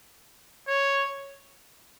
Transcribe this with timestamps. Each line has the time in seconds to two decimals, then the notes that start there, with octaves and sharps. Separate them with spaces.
0.68 C#5